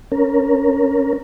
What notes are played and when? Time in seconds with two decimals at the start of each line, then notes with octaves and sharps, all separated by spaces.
0.12 C#4 A#4